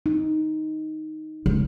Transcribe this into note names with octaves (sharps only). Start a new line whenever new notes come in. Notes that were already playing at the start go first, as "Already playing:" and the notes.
D#4
C#2